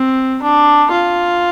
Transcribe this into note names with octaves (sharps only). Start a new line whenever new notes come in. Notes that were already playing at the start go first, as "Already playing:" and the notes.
Already playing: C4
D4
F4